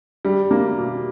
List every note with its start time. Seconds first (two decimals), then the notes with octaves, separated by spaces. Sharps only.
0.25 G3
0.51 A#3
0.78 B2